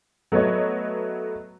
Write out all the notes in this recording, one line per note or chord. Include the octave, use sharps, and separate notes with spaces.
F#3 A3 B3 C#5 D#5